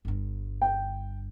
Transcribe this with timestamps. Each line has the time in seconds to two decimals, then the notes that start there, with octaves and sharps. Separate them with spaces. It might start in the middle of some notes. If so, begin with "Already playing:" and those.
0.05 G1 G2
0.62 G5